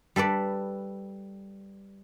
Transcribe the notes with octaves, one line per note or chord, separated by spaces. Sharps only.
G3 A4 B4 D5